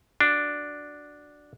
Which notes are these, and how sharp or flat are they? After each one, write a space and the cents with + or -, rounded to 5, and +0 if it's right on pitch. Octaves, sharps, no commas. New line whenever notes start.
D4 +0 F#4 +0